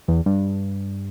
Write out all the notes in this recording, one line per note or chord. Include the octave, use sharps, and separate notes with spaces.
E2
G2